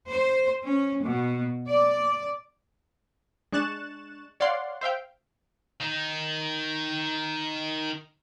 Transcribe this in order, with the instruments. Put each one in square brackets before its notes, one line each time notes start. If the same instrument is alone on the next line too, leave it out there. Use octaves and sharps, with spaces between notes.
[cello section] C5
C#4
B2
D5
[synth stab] G#3 D4 C#6 F#6 A6 E7
C#5 D5 F5 F#5 C6
C5 E5 F5 G5
[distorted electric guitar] D#3 D#4